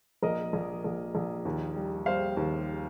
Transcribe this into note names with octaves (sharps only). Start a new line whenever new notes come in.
A#1 A#4 D#5
A#1
A#1
A#1
D#2
G3
G3 C5 F5
D#2